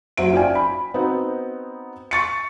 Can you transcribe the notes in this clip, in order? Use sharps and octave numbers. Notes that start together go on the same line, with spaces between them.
F#1 F#3 C5 E5 D7
C#4 F4 D5 G5 G#5
B5
B3 C4 D#4 F#4
C#6 A6 C#7